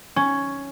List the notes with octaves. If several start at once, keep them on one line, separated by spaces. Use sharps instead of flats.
C#4